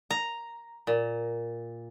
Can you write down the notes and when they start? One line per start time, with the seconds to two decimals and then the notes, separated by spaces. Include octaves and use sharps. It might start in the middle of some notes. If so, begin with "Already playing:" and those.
0.10 A#5
0.87 A#2